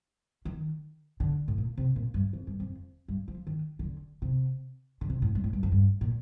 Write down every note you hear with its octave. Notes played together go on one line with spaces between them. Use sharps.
D#3
D3
A2
A#2
C3
A#2
G2
F2
G2
F2
G2
F3
D#3
D#3
D3
C3
D3
C3
A2
G2
A2
G2
F2
G2
A#2